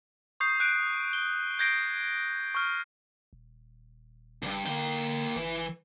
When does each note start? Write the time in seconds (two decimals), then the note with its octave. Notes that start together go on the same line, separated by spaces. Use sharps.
0.40 C#6 D#6 G6 C7
0.60 F#6 G6 C7 D7 D#7
1.13 G7
1.59 G6 G#6 A#6 C7 D7 G7
2.55 C#6 F6
3.33 D#1
4.43 F#1 C2 G2
4.66 D3 A#3 G5
5.36 G1 E3